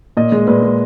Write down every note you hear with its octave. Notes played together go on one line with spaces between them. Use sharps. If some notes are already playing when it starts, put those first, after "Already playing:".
A#2 D#5
G#3
A#2 B4
G#3